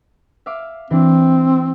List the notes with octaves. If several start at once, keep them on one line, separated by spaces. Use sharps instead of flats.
E5 F5 D6
E3 C4 D4